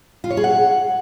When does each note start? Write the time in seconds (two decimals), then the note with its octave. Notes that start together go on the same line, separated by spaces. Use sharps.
0.24 F4
0.30 C#5
0.37 G#4
0.44 F#5